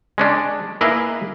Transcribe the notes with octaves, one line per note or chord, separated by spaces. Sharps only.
G#3 C#4 D4
A#3 E4 G#4 B4 D#5 F5